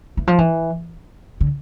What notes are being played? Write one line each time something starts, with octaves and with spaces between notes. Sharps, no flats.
E3
F3
E3
D3